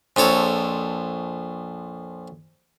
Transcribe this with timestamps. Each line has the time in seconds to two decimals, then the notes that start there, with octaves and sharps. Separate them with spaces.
0.16 A#1 F2 A4 C#5